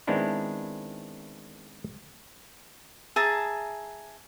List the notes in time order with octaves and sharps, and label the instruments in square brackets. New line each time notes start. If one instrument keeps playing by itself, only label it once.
[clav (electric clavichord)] D#3 G#3 B3 C4 D4 E4
[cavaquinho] G#4 E5 A5 A#5